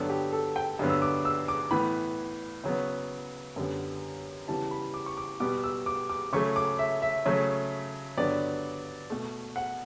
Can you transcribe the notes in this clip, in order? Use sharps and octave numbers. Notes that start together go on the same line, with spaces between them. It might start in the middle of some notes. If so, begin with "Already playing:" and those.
Already playing: G2 D3 F#3 B3 A4
G4
A4
G5
G2 D3 F#3 B3
E6
D6
E6
D6
A2 E3 B3 B5
C#3 F#3 B3
F#2 D3 G3 B3
C#3 E3 G3 B3 A5
B5
D6
C#6
D6
B2 G3 B3 D6
E6
D6
D6
C#3 F#3 A3 C#6
D6
E5
E5
C#3 F#3 A3
G2 D3 F#3 B3 D5
B2 A3
F#5